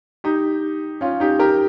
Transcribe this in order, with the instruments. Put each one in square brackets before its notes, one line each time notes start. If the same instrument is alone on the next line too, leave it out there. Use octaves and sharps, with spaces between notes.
[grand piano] D#4 G4
C#4 F4
D#4 G4
G4 A#4